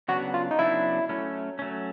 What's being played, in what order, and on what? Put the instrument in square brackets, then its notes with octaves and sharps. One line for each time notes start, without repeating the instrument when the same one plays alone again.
[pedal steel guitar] C#3 F#3 B3 D4 [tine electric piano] F#4
[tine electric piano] F4
D#4
[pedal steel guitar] C#3 F#3 B3 D4 [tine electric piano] E4
[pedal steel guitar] F#3 A3 C#4
F#3 A3 C#4